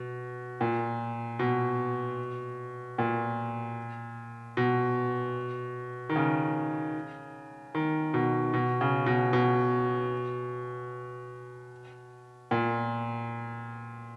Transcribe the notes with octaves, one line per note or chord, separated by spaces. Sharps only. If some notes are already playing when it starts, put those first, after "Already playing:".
Already playing: B2
A#2
B2
A#2
B2
D#3
C#3
D#3
B2
B2
C#3
B2
B2
A#2